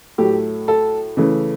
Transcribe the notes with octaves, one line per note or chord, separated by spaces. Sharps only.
A2 F#3 A3 G4
A4
C#3 E3 A3